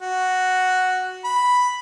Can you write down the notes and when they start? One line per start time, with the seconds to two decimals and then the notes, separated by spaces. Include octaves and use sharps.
0.01 F#4
1.24 B5